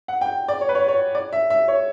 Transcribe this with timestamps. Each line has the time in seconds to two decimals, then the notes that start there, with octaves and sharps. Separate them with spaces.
0.08 F#5
0.21 G5
0.48 D5
0.61 C#5
0.69 B4
0.75 C#5
0.88 C#5
1.15 D5
1.33 E5
1.50 E5
1.68 C#5